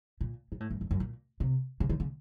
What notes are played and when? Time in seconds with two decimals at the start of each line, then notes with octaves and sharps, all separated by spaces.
0.21 A#2
0.52 A#2
0.60 A2
0.70 F#2
0.81 F2
0.91 F#2
1.00 A#2
1.40 C3
1.80 C#3
1.90 D#3
2.00 C#3